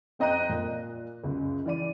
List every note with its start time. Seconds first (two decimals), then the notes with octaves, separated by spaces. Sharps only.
0.19 F2 C4 D#5 A#5 F#6 D#7
0.49 A#2 A#3
1.24 C#2 F#2
1.65 E3 D5 D#7